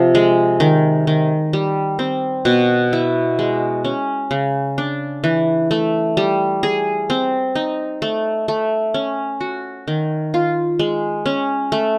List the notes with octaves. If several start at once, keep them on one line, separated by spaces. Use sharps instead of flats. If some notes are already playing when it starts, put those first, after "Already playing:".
Already playing: C3 F3
G#3
D#3
D#3
G3
C4
B2
E4
G#3
C#4
C#3
D4
E3
A3
G3
G#4
C4
D#4
A3
A3
C#4
F#4
D#3
F4
G#3
C#4
A3